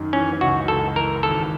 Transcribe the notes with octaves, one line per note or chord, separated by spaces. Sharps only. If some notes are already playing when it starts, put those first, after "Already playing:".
Already playing: F#2 D#3
E3 C#4
C#2 F#4
C#2 A4
E3 A#4
G#1 A4